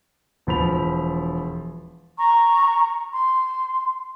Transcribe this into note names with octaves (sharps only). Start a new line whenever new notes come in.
E1 F3 B5 F7
A#5 C#6
C6